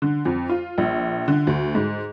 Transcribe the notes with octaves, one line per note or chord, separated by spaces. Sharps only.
D3
F2
F4
A#1
D3
D2
G#2